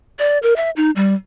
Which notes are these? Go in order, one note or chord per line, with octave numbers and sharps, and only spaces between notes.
D5
A#4
E5
D#4
G3